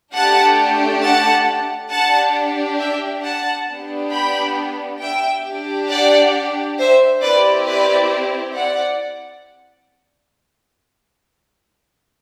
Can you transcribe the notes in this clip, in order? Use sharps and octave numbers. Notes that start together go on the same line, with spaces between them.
A3 D4 G4 F#5 A5
F#5 A5
D4 F#5 A5
G4
E5 G5
F#5 A5
B3 D4 G4
G5 B5
E5 G5
D4 G4
D5 F#5
C5 E5
C4 E4 G4 B4 D5
B4 D5
D5 F#5